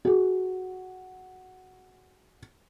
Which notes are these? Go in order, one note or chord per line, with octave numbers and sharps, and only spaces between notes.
F#4 G#4